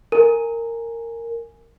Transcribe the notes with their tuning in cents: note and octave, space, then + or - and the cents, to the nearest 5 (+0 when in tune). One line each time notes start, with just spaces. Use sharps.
A#4 -15 G#5 +0